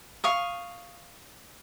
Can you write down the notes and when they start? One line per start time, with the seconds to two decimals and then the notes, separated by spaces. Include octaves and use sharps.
0.24 F5 C#6 D#6